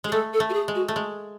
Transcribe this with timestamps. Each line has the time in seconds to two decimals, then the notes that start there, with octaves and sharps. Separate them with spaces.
0.04 G#3 G#4
0.12 A3 A4
0.33 A4
0.40 A3
0.49 F#4
0.53 G#4
0.68 G#3
0.75 F#4
0.88 A3
0.96 G#3